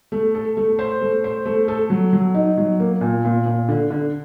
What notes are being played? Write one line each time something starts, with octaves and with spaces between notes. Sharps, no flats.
A3
A4
A3
C5
A3
C5
A3
A4
F#3
F#3
D#4
F#3
A#3
A#2
A#2
A#2
D3
D3